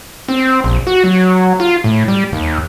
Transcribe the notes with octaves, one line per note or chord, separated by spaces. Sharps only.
C4
A#1
F#4
F#3
F4
A2
G3
D#2